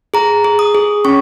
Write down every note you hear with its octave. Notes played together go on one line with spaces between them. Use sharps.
G#4 A#5
G#4
D#6
G#4
C#4 C#6